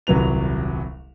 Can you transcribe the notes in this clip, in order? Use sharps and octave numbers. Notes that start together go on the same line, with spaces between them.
D#1 C2 F#3 B4 F7